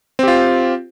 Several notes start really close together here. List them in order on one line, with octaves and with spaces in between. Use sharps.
C4 G4 F4